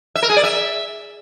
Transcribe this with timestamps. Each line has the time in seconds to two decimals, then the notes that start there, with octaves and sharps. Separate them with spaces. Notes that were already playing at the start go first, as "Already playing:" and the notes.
0.15 E5
0.23 A#4
0.30 G#4
0.37 D5
0.44 E5